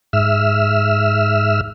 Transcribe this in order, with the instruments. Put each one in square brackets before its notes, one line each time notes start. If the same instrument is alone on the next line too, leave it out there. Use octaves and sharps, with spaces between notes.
[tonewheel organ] G#2 E5 E6 F6